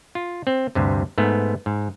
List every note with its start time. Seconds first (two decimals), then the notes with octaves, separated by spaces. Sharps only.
0.15 F4
0.47 C4
0.75 D2 G2 C3
1.18 G#2 A3 B3
1.66 G#2